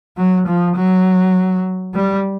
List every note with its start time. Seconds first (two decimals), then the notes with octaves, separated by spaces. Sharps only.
0.17 F#3
0.47 F3
0.76 F#3
1.95 G3